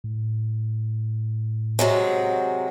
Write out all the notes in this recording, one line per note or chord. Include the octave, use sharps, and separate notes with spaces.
A2
C3 F#3 G#3